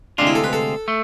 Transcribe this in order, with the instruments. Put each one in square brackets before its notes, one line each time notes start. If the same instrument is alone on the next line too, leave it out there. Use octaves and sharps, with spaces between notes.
[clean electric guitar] D2 C3 G#3 C4 F4 [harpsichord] D4
[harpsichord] E4
A4
B4
A4
[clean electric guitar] A3